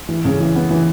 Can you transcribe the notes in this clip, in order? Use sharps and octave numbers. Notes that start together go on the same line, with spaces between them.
E3
C#3
E3
B3
E3